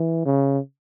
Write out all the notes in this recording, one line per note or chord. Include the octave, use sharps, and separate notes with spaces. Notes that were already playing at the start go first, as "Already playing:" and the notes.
Already playing: E3
C#3